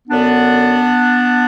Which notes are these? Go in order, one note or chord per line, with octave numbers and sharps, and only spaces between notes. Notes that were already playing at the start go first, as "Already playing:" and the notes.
F#2 D3 B3 D4